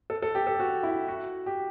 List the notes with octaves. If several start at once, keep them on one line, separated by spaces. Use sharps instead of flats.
A4
A4
G4
A4
F#4
E4
F#4
G4